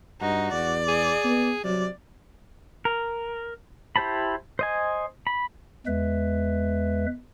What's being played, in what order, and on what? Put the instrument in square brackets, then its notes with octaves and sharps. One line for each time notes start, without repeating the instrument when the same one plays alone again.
[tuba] G2 [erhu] D#4 [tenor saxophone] F#4
[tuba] E2 [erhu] D5
[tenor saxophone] G#4
[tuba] B3
[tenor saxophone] C3 [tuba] F#3 [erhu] D5
[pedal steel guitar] A#4
E4 G4 C5 A5 B5
C5 D#5 G#5
B5
[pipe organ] E2 G#3 B4 E5